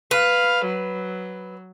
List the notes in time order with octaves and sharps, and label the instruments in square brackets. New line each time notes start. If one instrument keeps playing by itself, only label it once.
[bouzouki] B4 [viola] F5
[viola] F#3